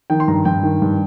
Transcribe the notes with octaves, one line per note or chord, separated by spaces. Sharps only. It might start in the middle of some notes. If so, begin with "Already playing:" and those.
D#3 G5
C6
G2 A#5
G2 G5
D#3
G2